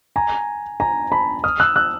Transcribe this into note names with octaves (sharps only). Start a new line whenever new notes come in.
G#5 A#5
G#5 A#5
A5 B5
D#6 F6
E6 F#6
E6 F#6